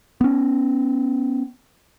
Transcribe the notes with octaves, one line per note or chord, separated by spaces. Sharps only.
B3 C#4